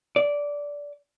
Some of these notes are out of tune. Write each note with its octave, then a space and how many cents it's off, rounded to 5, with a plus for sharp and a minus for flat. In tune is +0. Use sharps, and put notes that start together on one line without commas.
D5 -15